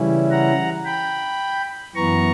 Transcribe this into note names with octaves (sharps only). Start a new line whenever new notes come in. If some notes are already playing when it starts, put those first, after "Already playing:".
Already playing: C#3 E3 G3 C#4 E4
F#5 A#5
G5 B5
F#2 E3 B3 A#5 C#6